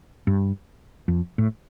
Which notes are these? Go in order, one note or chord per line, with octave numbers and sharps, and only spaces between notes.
G2
F2
A2